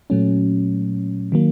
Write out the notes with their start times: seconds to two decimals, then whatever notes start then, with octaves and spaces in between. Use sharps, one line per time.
0.10 A#2 F#3 A3 C#4
1.32 D#3 F#3 A#3